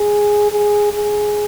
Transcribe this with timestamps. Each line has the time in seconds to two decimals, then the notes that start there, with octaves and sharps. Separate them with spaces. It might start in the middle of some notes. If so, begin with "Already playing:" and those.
Already playing: G#4
0.52 G#4
0.93 G#4